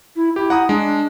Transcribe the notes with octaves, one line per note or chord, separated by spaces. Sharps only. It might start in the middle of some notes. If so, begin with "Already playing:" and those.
E4
E4 G4
F#5 A#5 D#6
G#3 D4